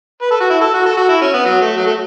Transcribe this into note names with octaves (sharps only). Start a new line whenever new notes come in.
B4
A4
F#4
E4
A4
F#4
A4
F#4
E4
C#4
B3
F#3
A3
F#3
A3